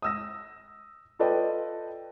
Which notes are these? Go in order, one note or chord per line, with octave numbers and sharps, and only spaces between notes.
D#6 E6 A#6
F4 A4 B4 D5 D#5 G5